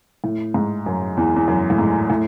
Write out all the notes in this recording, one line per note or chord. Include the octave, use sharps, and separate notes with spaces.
A2
G#2
F#2
E2
E2
F#2
A2
G#2
A2